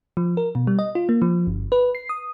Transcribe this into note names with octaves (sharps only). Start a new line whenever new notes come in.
F3
A#4
B2
G3
D#5
F4
A#3
F3
G1
B4
C7
D#6